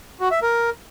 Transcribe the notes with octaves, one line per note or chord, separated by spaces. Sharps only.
F#4
E5
A#4